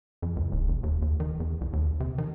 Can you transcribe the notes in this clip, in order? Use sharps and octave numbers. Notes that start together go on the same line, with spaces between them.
F2
C#2
D1
F1
D#2
D#2
D#3
E2
C2
D#2
C3
D#3